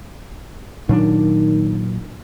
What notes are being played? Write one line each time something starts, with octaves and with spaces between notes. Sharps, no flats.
A#2 D#3 F#3 D4